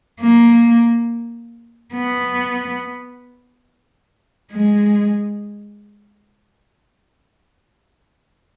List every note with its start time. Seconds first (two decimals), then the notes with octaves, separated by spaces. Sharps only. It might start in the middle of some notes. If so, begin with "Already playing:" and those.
0.21 A#3
1.93 B3
4.52 G#3